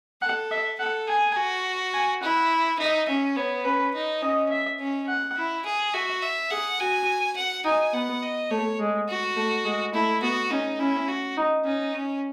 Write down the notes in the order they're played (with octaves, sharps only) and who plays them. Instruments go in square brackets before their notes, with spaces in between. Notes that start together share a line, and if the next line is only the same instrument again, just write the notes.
[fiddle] A4 [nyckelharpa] F#5
[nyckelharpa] E5
[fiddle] A4 [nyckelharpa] F#5
[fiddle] G#4 [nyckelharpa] G#5
[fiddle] F#4
[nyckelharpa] G#5
[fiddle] E4 [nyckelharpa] F#5
[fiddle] D#4 [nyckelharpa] E5
[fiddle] C#4 [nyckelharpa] E5
[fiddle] B3 [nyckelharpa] C#5
[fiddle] C#4 [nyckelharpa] B4
[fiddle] D#4
[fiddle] C#4 [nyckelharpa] D#5
[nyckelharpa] E5
[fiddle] C#4
[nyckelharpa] F#5
[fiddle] E4
G#4
[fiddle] F#4 [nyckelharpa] E5
[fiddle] E5
[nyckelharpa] G#4 [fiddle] F#5
[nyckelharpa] F#4 [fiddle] G#5
[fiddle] F#5
[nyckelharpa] D#4 [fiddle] G#5
[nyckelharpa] B3 [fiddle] F#5
[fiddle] D#5
[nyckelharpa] A3 [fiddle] C#5
[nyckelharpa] G#3
[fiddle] F#4
[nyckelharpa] A3
G#3
[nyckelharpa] A3 [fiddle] E4
[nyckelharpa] B3 [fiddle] F#4
[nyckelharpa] C#4 [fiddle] D#4
[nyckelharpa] C#4 [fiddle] E4
[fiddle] F#4
[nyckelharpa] D#4
[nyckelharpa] C#4 [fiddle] D#4
[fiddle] C#4